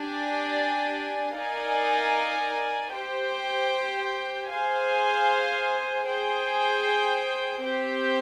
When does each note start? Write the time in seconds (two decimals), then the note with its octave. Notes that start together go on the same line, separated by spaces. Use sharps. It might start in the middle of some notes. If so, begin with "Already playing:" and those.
Already playing: D4 G4 D5 G#5
1.35 D#4 A#4 D5 F5 G#5
2.92 G4 C5 G5
4.49 G#4 C5 F5 G#5
6.06 G#4 C5 G5
7.63 C4 G4 C5 G5